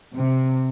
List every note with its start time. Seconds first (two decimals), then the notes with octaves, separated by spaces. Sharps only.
0.14 C3